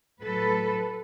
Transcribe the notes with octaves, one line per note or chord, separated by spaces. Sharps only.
A2 F#3 A4 B4